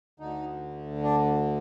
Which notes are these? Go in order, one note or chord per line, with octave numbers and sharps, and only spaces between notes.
D2 D3 D#4
D4